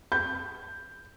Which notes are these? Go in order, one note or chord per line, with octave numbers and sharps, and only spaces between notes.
G6